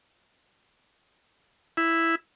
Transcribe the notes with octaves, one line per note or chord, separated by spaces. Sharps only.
E4